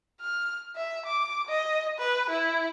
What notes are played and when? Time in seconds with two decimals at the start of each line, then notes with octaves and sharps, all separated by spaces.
0.20 F6
0.76 E5
1.05 D6
1.48 D#5
1.98 B4
2.29 E4